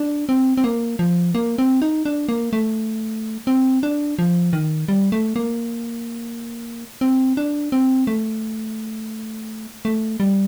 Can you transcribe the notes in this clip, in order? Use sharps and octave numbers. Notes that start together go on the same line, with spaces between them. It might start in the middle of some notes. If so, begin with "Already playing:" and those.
Already playing: D4
C4
C4
A#3
F3
A#3
C4
D#4
D4
A#3
A3
C4
D4
F3
D#3
G3
A3
A#3
C4
D4
C4
A3
A3
G3